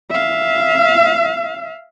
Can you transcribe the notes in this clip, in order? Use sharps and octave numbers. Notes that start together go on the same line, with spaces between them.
E5 F5